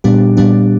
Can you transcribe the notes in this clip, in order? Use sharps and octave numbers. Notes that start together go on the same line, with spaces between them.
A#2 G3 B3 D4 G4
A#2 G3 B3 D4 G4